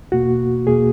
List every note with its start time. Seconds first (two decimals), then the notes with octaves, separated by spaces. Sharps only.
0.12 E2 B2 A#3 F#4
0.66 E2 B2 A#3 G#4